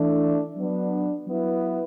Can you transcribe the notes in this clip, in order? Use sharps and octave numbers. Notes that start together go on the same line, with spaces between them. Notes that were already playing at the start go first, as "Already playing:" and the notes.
Already playing: E3 A3 D4
F#3 B3 D4
F#3 B3 E4 B4